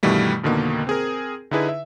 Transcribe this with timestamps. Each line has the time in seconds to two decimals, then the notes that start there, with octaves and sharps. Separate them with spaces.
0.03 G2 B2 D#3 E3 G3 A3
0.43 F2 B2 D3 D#3 A#3
0.87 C4 G#4 A#4
1.51 D3 D#4 E4 G#4 B4
1.68 E5